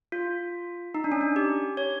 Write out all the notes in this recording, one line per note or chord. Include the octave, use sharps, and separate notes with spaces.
F4
D#4
D4
C#4
D4
G4
C#5